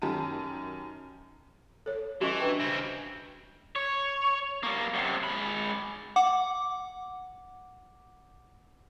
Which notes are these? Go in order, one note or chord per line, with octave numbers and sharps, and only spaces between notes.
F#2 D#3 G4 A5 A#5 D#7
A4 C#5
E3 G3 C#4 F#4 D#5 C#6
D4 B4 G5
C#3 C4
C#5
G3 A#3
F#2 C3
G#3 B5
F#5 D6